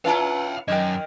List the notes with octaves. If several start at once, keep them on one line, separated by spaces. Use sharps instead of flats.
C#4 E4 F4 B4 F5 F#5 A#5
F#2 D#3 A#4 D#5 G5